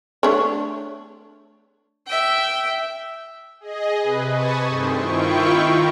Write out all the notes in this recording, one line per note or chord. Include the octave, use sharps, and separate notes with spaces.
A3 D4 C#5
E5 G5
G#4 D#5
C3 B4
G#5 A5 B5 C#6 D#6
G2 D#3 A3 C4 C5
D#3 E4 F4 G5 C#6
A#4